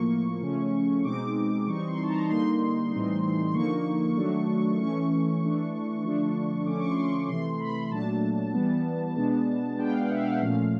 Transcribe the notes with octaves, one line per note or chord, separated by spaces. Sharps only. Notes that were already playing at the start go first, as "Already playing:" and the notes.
Already playing: A2 F3 A#3 C#6
C#3 F3 A3 C#4
B2 G#3 C4 D#4 D6
E3 G3 C4 D#4 C#6
C6
A5
A#5
D3 G3 A#3 D#4 C6
A2 E3 G3 C4 D#4
C6
D3 F3 A#3 D#4 C#6
D#3 F#3 A3 D4
E3 A3 C#4 C#6
E3 A3 D4
D3 F3 A3 D4
D3 F3 A3 C#4 D6
C#6
C6
C#6
C3 E3 A3 C6
B5
A#2 F#3 A3 D4 A5
E3 G3 B3
B2 G#3 B3 D4
B2 G#3 B3 D4 G5
F5
F#5
E5
F5
F#5
A#2 F3 A3 C#4 F5